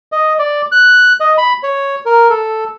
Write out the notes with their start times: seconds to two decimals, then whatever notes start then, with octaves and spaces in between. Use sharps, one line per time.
0.12 D#5
0.39 D5
0.72 F#6
1.20 D#5
1.38 B5
1.63 C#5
2.06 A#4
2.30 A4